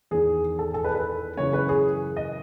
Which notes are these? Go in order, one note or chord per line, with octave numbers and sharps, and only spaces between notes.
E2 D#3 G#4
A4
A4
B4
B4
F#2 C#3 E3 C#5
B4
G#4
D#5